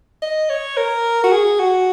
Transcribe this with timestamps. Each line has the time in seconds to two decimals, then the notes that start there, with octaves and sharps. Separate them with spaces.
0.22 D#5
0.50 C#5
0.77 A#4
1.24 F#4
1.32 G#4
1.60 F#4